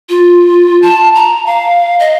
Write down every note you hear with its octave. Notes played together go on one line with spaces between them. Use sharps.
F4
A5
A#5
F5
D#5